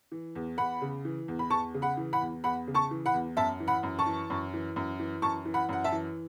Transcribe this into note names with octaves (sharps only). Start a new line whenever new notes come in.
E3
E2
E2 F#5 B5
C#3
E3
E2
B5
E2 A5 C#6
C#3
F#5 B5
E3
F#5 B5
E2
E2 F#5 B5
C#3
A5 C#6
E3
F#5 B5
E2
F#2 E5 A5
E3
F#5 B5
F#2
A5 C#6
E3
F#2
E3
F#2
E3
F#2 A5 C#6
E3
F#5 B5
F#2 F#5
E5 A5
E3